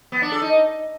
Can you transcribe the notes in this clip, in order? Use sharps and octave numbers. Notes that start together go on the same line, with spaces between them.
B3
D4
A4
D#4